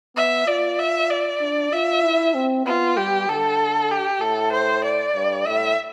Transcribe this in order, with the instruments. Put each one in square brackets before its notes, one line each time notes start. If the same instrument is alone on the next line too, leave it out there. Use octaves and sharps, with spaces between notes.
[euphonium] B3 [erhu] E5
[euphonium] F4 [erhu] D5
[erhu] E5
D5
[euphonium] D4
[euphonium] F4 [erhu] E5
[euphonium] E4
C4
[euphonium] B3 [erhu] F4
[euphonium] G3 [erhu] G4
[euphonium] D3 [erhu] A4
[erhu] G4
[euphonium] A2 [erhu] A4
[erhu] C5
D5
[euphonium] G2
[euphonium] A2 [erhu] E5